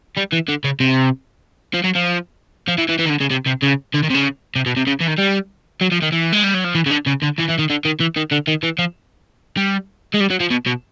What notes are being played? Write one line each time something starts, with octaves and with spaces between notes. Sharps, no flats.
G3
E3
D3
C#3
C3
F3
F#3
F3
F3
E3
E3
E3
D#3
D3
C#3
C3
C3
C#3
D3
D#3
C3
C#3
C3
B2
C3
C#3
E3
D#3
G3
F#3
F3
D#3
E3
G#3
G3
F#3
F3
E3
C#3
D3
C#3
D3
E3
E3
D#3
D3
D#3
E3
D#3
D3
D#3
E3
F3
G3
G#3
G3
F#3
F3
B2
B2